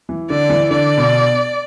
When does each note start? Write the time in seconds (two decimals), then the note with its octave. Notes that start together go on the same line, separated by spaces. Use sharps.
0.09 E3
0.30 D3 D5
0.49 E3
0.71 D3 D5
0.97 B2